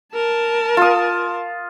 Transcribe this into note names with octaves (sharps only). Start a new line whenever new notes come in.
A#4 A5
F4 D#6